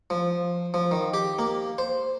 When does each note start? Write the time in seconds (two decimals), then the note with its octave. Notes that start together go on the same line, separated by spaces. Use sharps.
0.10 F3
0.74 F3
0.91 D#3
1.14 G4
1.39 A#3
1.78 C5